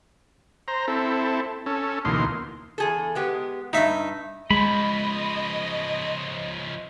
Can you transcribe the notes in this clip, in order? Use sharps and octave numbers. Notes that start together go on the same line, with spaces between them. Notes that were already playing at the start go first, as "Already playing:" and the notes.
C5 A#5
C4 E4 A4
C#4 A4
D2 B2 E3 A#3 D#4 C6
E2 G#4 A4
G#3 B3 G4
E2 G2 D#4 E5
C#3 F3 G#3 D#5 B5